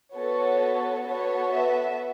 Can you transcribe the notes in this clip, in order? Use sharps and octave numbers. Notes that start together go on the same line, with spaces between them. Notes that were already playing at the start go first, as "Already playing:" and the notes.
B3 F#4 A4 C#5
B3 F#4 A4 C#5
E5